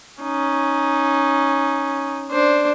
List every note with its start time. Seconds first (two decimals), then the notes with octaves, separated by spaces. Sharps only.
0.21 C#4 D#4
2.31 D4 C5